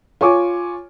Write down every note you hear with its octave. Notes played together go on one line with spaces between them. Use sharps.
F4 C#5 G#5 C#6 D6